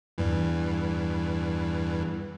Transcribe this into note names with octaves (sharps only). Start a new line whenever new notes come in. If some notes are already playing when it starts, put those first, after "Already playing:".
E2 G2 E3